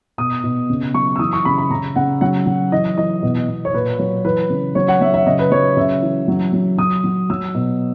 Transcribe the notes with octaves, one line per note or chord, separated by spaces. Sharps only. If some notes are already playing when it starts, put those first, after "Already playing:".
B2 D#6
B2
C#3
F#3 C#6
E6
E3 D#6
C#6
C#3 B5
B5
C#3 A#5
C#3 F#5
F#3 F#5
F#3
E3 D#5
E3 D#5
B2
B2
C#5
A#2 B4
F#3 C#5
E3 B4
C#3
F#3 C#5
F#5
F#3 E5
E5
C#3 D#5
B4
F#3 C#5
C#3 E5
E3
F#3
F#3
F#3 D#6
F#3
F#3 E6
B2